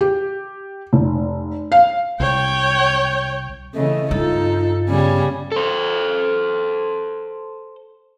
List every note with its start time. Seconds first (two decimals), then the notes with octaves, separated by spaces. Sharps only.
0.01 G4
0.93 F1
1.72 F5
2.20 C2 C#5 G5
3.75 C#3 E3 A3 D#5
4.11 G2 D#4 F4 A4
4.89 C#3 G3 B3 G#5
5.52 A4 C5